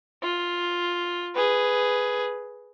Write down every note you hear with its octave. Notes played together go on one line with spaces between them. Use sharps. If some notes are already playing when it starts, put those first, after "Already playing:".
F4
G#4 B4